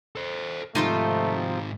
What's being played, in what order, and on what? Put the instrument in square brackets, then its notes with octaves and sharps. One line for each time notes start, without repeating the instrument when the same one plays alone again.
[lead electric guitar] A4 C5
[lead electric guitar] G#2 D#3 [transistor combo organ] C3 F3 [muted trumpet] A3 [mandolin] D#4 F4 C5